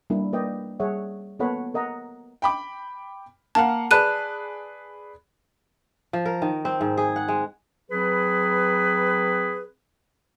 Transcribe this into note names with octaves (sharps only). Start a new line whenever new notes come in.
G3 A#3 D4 E4
A#3 B4 D5 D#5 G5
G3 G#4 C#5 E5 F#5
A#3 B3 A4 C#5 F#5 B5
A#4 D#5 F#5 A#5
G5 B5 D6
A#3 F5 F#5 A5
G#4 B4 D5 A5 F#6 D#7
F3
A#4
D#3
C4
G#2
G#4
F#5
G#3
F#3 C4 G#4 B4